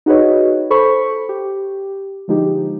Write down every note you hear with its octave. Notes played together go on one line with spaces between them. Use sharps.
D#4 F#4 G#4 B4 C#5 D#5
A4 C5 B5 C#6
G4
D3 F3 G#3 D#4 G4